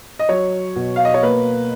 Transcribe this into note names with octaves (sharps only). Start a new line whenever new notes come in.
D#5
F#3 C#5
B2
F5
D#5
C#5
A#3 B4